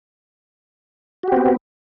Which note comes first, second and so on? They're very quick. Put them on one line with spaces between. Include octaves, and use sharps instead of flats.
F#4 G4 C4 B3